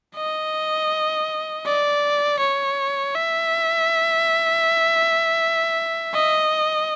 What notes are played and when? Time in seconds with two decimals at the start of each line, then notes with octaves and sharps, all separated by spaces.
0.16 D#5
1.66 D5
2.40 C#5
3.15 E5
6.14 D#5